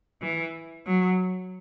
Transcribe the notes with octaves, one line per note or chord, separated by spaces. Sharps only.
E3
F#3